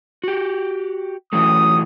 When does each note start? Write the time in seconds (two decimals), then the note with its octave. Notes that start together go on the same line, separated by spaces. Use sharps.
0.24 F#4 G4
1.33 E3 F#3 A3 D#6